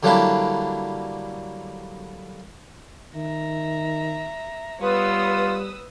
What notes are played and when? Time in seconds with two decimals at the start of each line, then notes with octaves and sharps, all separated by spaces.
0.03 D3 F#3 G3 A#3 D4 E4
3.15 D#3 E5 A#5
4.81 G3 B3 F4 B4 C#5 D#6 E6